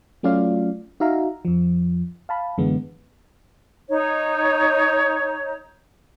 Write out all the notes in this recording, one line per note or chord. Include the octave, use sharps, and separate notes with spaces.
F#3 A3 C#4 F4 D5 F5
D#4 F#4 E5 F5 A#5
F2 F3
F5 A5 B5
F#2 D3 E3 G#3 B3
D#4 C#5